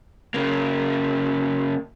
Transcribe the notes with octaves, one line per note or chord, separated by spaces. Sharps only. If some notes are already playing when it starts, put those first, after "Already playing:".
C#3 A#3